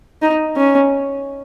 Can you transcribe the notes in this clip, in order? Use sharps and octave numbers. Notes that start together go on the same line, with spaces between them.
D#4
C#4